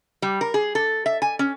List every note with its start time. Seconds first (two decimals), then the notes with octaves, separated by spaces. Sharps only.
0.22 G3
0.41 A#4
0.54 G#4
0.75 A4
1.06 E5
1.22 G#5
1.39 C#4